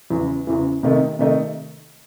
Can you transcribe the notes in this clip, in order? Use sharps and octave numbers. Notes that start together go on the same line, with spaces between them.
E2 C#3 E3
E2 C#3 E3
C3 D#3 A3 D#4
C3 D#3 A3 D#4